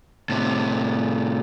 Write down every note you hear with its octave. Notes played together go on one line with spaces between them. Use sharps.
A2 C3